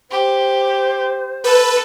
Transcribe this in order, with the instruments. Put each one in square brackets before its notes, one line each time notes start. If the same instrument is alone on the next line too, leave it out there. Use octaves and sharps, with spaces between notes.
[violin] G4 [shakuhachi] C5
[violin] A4 [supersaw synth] B4